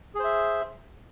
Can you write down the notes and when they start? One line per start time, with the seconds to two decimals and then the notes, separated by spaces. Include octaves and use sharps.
0.15 G#4
0.19 C5
0.24 E5